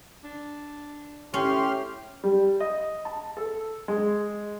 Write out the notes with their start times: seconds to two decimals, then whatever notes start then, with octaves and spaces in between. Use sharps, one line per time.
0.24 D4
1.34 A2 C#4 G4 C6 F6
2.24 G3
2.60 D#5
3.05 A5
3.37 A4
3.88 G#3